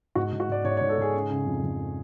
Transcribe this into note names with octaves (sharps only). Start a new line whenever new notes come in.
G#2 F#4
G#2
F#4
G#2 D5
G#2 C#5
C#5
G#2
A4
G#2 G#4
C#3
C#3
F2
F2